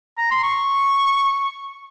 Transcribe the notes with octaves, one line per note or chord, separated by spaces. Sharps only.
A#5
C6
C#6